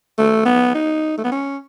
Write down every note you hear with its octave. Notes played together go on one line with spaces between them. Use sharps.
A3
B3
D#4
A3
B3
C#4